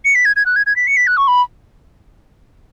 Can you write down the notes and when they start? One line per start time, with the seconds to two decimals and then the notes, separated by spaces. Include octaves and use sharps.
0.05 C#7
0.15 B6
0.25 G#6
0.36 G#6
0.46 F#6
0.56 G#6
0.66 G#6
0.76 B6
0.87 C#7
0.97 B6
1.07 F#6
1.17 C#6
1.28 B5